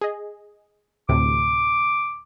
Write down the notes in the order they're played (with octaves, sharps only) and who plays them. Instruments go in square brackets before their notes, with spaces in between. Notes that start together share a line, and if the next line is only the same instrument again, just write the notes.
[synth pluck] G#4 D#5
[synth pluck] D2 A2 C3 [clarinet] D6